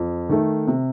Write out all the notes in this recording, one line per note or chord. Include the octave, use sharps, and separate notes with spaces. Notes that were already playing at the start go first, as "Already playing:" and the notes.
Already playing: F2
D#3 A3
C3